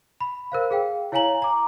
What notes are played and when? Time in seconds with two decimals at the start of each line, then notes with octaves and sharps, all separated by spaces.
0.20 B5
0.52 A#4 C5 F5
0.71 G#4 F5 G5
1.12 E4 C#5 F5 G#5 A#5 F#7
1.42 A#5 D6